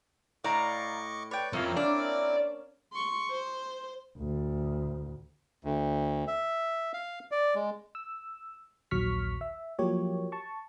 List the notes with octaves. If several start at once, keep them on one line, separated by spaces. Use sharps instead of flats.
A2 D5 D#5 F5 A#5 C#6 D6
B4 C#5 D5 G5
F2 A#3 C4 C#4 E4 A#4
D4 D5
C6 C#6
C5
D2 A2
D2
E5
F5
D5
G#3
E6
A#1 D#2 F#3 C#6 F6 B6
E5
F3 F#3 A#3 G4 C#5
A5 C#6